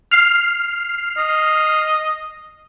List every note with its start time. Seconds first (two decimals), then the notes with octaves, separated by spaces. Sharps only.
0.11 F6 C7
1.18 D#5